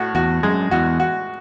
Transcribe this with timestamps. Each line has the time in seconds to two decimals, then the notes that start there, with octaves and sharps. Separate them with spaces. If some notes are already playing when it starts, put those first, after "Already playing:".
Already playing: A2 F#4
0.15 E2 F#4
0.43 F#2 G#3
0.71 E2 F#4
1.00 F#4